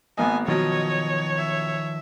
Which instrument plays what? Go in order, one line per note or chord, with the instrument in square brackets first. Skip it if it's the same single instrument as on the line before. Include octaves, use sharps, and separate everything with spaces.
[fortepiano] G#1 A#3 D#5 [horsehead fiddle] B3 [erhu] G#5
[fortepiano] B2 F#3 [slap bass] D#3 F3 [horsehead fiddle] C#5 [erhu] D#5
[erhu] E5